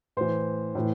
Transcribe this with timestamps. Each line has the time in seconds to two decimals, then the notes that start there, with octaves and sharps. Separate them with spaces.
0.17 A2 E3 C5
0.75 A2 E3